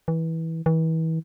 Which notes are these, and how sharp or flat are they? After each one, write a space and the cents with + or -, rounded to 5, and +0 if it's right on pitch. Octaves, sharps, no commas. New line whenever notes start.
E3 -20
E3 -35